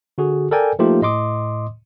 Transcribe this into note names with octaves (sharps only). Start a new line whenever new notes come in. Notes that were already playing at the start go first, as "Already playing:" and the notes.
D3 F#4 G#4
A4 A#4 D5 G5 G#5
F3 A3 A#3 D#4 F4 G4
A2 D#5 C6 D6 D#6